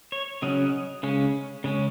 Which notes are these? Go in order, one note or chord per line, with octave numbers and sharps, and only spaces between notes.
C#5
C#3 F#3 C#4 D#5
C#3 G#3 C#4
C#3 G#3 C#4